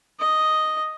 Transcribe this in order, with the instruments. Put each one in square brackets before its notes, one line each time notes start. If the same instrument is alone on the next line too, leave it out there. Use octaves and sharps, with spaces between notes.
[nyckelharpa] D#5